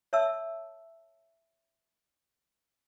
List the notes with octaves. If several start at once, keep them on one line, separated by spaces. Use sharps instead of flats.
C#5 E5 A5 E6